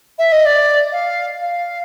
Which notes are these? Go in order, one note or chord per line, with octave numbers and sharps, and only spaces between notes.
E5
D#5
D5
F5
F5